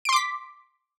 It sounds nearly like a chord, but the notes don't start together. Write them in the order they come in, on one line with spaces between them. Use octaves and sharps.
D7 C6 D6 B6